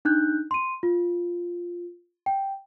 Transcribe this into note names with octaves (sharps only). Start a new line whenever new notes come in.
D4 D#4 F#6 G6
C6 D#7
F4
G5